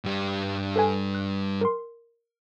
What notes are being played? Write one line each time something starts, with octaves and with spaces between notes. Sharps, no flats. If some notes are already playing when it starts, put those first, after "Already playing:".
G2 G3
A4 B4 G#5
F#6
A#4 C6